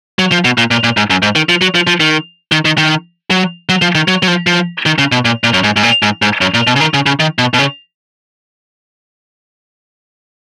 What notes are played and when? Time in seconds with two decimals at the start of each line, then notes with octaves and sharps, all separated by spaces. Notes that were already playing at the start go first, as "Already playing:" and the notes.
0.19 F#3
0.32 F3
0.45 B2
0.58 A#2
0.71 A#2
0.84 A#2
0.97 G#2
1.10 F#2
1.22 G#2
1.36 D#3
1.49 F3
1.61 F#3
1.75 F3
1.87 F3
2.00 D#3
2.52 D#3
2.65 D#3
2.78 D#3
3.30 F#3
3.69 F#3
3.82 F3
3.95 D#3
4.08 F#3
4.23 F#3
4.28 F3
4.47 F3
4.86 D#3
4.98 C#3
5.12 B2
5.25 A#2
5.44 A#2
5.54 F#2
5.64 G#2
5.76 G#2
5.83 A#2
6.02 G#2
6.22 G#2
6.41 F#2
6.54 A#2
6.67 B2
6.76 C#3
6.80 D#3
6.94 C#3
7.06 C#3
7.20 D#3
7.39 B2
7.54 B2
7.58 C#3